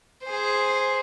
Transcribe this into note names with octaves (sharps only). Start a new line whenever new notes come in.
G#4 C5